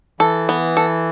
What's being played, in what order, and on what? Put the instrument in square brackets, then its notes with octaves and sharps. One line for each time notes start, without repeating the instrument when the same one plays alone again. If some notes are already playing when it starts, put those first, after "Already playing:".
[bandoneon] E3 [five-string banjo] A4
[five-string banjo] B3
A4